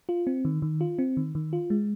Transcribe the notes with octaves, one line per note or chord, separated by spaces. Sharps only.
F4
C4
D#3
D#3
F4
C4
D#3
D#3
F4
G#3